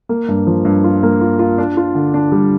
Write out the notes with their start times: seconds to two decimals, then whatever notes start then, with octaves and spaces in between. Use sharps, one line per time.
0.09 A#3
0.28 G2
0.47 F3
0.65 G2
0.84 F4
1.03 A#3
1.21 F4
1.39 F4
1.58 D4
1.77 F4
1.95 D3
2.14 D4
2.32 G3